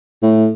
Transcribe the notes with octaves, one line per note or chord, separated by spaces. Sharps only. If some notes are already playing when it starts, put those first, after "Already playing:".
A2